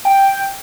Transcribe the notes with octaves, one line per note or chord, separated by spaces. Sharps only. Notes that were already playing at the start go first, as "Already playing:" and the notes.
G5